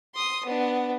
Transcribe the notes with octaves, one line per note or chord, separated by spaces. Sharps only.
C6 D#6
B3 D4